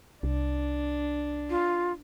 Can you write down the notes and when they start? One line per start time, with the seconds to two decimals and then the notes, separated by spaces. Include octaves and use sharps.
0.23 C2 D4
1.50 F4